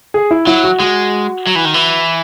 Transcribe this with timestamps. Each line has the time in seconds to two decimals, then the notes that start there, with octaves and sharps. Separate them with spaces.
0.14 G#4
0.31 E4
0.47 F#3 E4
0.64 F#4
0.80 G#3 F#4
1.47 F#3
1.55 E3
1.65 D#3
1.74 E3